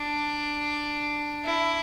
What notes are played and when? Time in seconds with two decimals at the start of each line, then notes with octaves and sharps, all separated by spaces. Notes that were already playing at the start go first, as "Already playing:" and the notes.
Already playing: D4
1.45 E4